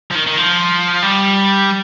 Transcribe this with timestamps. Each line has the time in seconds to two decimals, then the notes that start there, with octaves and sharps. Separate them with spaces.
0.11 F3
0.15 D#3
0.27 D#3
0.37 F3
1.02 G3